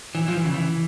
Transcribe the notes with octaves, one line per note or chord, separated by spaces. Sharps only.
E3
F3
E3
C#3
E3